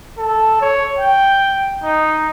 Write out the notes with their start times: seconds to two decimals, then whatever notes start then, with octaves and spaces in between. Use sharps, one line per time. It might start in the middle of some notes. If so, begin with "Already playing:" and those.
0.18 A4
0.61 C#5
0.99 G5
1.84 D#4